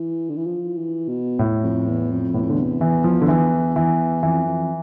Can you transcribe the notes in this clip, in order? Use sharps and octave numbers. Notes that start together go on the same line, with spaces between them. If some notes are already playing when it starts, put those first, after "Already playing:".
Already playing: E3
D3
E3
F3
E3
B2
A2
F2
E2
F2
E2 A2
F2
E2 D3
C3
E3
F3
D3
E3
E3
F2 E3
F2